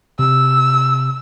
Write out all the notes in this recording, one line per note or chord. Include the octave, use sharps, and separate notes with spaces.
C3 E6